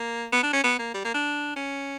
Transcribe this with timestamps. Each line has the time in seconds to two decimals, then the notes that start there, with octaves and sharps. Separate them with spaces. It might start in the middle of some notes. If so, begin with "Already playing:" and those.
Already playing: A#3
0.32 B3
0.43 D4
0.53 C#4
0.64 B3
0.79 A#3
0.94 G3
1.05 A#3
1.14 D4
1.56 C#4